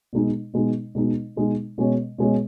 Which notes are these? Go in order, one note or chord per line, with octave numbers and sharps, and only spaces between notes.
B2 G#3 D#4
B2 G#3 D#4
B2 G#3 D#4
B2 G#3 D#4
B2 G#3 C#4
B2 G#3 C#4